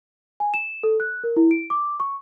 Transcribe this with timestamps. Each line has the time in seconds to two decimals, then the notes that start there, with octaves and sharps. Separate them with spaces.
0.40 G#5
0.54 E7
0.83 A4
1.00 F#6
1.24 A#4
1.36 E4
1.51 D7
1.70 D6
2.00 C#6